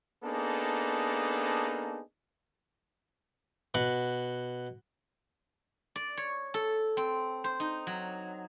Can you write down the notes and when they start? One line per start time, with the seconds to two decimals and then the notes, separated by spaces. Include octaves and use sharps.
0.24 A#3 B3 D4 D#4 G#4 A4
3.74 B2 F#5
5.96 D5
6.17 C#5
6.54 A4
6.97 C4
7.44 C5
7.60 D#4
7.87 F#3